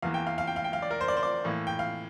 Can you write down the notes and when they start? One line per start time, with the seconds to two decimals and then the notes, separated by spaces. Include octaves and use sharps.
0.02 E2 E3 A#3 F5
0.14 G5
0.27 F5
0.38 F5
0.47 G5
0.56 F5
0.64 G5
0.73 F5
0.82 D5
0.91 A#4
1.01 C5
1.08 D5
1.17 C5
1.23 D5
1.45 A2 E3 A#3
1.67 G5
1.79 F5